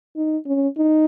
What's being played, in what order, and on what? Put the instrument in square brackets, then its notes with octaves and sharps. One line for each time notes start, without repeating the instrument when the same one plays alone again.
[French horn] D#4
C#4
D#4